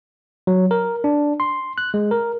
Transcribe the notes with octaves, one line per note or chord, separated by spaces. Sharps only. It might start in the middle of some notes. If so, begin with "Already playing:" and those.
F#3
A#4
D4
C6
F#6
G#3
A#4